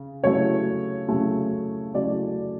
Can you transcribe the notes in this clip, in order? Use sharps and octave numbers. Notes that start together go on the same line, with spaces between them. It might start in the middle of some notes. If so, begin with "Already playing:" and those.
Already playing: C#3
C#3 F#3 A3 C#5
C#3 F#3 A3
C#3 F#3 A3 D5